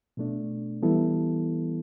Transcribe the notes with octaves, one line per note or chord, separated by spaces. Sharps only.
B2 A3 D4
E3 G3 B3 E4 A4